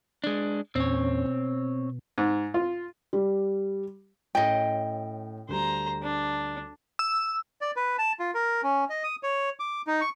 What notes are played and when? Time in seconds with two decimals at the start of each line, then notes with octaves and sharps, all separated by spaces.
0.24 G#3 D4
0.76 E2 A#2 C4 C#4 C#5
1.26 B2
2.18 G#2
2.54 F4
3.13 G3
4.35 A2 C#4 D#5 G5
5.49 D2 G3 C5 A#5
6.02 D4
6.99 E6
7.61 D5
7.76 B4
7.98 A5
8.20 F4
8.34 A#4
8.63 C#4
8.90 D#5
9.04 D#6
9.23 C#5
9.60 D6
9.87 D#4
10.01 C#6